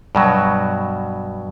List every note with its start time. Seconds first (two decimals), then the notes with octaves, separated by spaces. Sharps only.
0.15 G2 B2 F#3